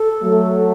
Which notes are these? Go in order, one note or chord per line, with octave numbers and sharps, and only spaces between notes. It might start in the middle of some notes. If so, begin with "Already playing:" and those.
Already playing: A4
F#3 A3